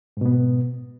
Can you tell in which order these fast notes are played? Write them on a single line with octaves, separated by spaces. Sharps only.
G#2 B2 B3